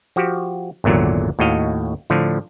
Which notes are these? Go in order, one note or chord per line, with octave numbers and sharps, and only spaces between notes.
F3 F#4 G4
G#1 E2 A#2 D3 F#3
D#2 A2 F#4 D#5 F5
A2 D3 F3